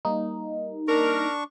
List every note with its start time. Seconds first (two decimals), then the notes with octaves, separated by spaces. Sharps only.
0.05 G3 A#3 D#4
0.88 D4 A#4 C#6